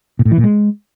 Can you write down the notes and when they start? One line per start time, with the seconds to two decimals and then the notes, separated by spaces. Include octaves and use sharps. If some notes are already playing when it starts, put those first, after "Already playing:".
0.19 A#2
0.25 A2
0.31 E3
0.38 A#2
0.44 G#3